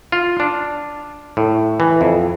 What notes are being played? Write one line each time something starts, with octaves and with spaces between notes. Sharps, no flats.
F4
D4
A2
E3
F2